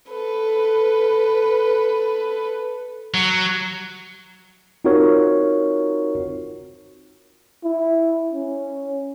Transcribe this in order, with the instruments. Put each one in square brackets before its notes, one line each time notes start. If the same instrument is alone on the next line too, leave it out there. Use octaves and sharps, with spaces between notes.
[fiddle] A4 B4
[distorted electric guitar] F#3
[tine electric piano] C4 D#4 F4 F#4 A#4 C#5
[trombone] E4
C#4